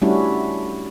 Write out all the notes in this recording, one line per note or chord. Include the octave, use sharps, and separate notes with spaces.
G3 A3 C#4 D4 E4 F#4